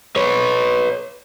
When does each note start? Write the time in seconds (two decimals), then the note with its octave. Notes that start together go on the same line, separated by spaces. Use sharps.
0.16 B4 C#5